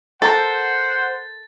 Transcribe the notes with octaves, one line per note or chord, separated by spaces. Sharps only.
A4 A#4 C5 F#5 A6